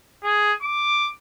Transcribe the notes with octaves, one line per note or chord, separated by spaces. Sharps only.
G#4
D6